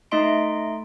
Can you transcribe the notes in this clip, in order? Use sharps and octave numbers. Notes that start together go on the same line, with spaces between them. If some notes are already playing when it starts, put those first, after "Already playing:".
A3 D#4 D#5 E5 C6 D7